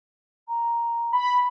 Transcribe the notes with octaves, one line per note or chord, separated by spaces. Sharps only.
A#5
B5